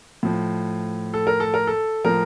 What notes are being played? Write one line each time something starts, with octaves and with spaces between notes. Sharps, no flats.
A2 F3
A4
A#4
A4
A#4
A4
A2 F3 A#4